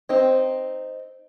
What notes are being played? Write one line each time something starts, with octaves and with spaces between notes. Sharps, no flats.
C4 D#4